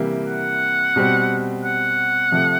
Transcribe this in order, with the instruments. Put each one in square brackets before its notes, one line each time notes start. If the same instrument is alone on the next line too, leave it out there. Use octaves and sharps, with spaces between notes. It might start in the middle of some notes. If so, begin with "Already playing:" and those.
Already playing: [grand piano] C3 E3 G3 A#3
[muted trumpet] F#5
[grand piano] B2 G3 C4
[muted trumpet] F#5
[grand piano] C3 F3 A3